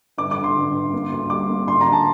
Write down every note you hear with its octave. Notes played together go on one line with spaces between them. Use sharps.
G1 D6
D6
D3
C6
G1
G1
A#3
D2
G3 D6
A#3
D2 C6
A#5
D3
A5